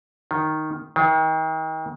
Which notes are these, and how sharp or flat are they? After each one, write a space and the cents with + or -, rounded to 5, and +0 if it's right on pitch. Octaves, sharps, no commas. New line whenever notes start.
D#3 +0
D#3 +35